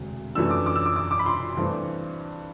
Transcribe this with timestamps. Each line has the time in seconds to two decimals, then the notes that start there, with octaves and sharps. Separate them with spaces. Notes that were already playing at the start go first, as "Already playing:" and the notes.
Already playing: E1 D2 C3
0.35 F#2 E3 A3 D4 E6
0.51 D6
0.66 D6
0.76 E6
0.86 D6
0.96 D6
1.11 D6
1.19 B5
1.26 C6
1.57 G2 E3 A3 C4 E4